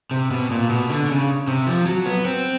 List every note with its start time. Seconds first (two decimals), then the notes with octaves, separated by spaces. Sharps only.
0.11 C3
0.31 B2
0.50 A#2
0.69 B2
0.89 D3
1.09 C#3
1.47 C3
1.67 F3
1.86 F#3
2.06 B3
2.25 C4